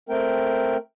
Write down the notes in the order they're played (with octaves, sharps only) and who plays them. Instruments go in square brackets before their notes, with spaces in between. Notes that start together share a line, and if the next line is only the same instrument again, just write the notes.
[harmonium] A3 C4 A#4 G5